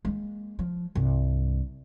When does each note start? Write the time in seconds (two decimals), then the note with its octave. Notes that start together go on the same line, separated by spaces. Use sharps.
0.05 G#3 A#3
0.59 F3
0.95 C2 G2